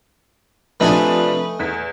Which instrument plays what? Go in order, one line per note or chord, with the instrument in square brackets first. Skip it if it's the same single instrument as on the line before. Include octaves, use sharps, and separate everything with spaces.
[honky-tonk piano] C3 F3 D4 [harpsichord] A3 D#4 G#5 [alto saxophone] B4
[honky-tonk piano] E2 B6